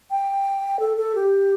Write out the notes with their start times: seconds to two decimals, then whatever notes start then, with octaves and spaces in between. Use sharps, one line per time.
0.11 G5
0.80 A4
0.97 A4
1.15 G4